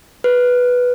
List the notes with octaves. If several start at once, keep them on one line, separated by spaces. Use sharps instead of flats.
B4